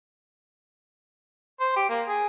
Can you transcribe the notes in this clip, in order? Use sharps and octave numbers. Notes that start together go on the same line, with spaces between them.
C5
G4
A#3
G#4